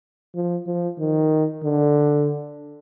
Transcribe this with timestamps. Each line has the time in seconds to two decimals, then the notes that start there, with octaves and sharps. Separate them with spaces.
0.35 F3
0.67 F3
0.99 D#3
1.64 D3